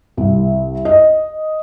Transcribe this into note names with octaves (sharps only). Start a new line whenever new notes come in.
C2
D#5